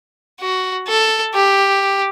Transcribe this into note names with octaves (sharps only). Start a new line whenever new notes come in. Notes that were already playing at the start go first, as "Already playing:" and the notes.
F#4
A4
G4